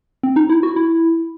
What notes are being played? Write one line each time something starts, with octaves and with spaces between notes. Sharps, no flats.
C4
D#4
E4
F#4
E4